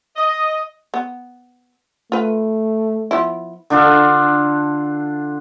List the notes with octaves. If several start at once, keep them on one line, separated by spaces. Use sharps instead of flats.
D#5
B3
A3 F4 B4
F3 B3 E4
D3 D4 F4 A4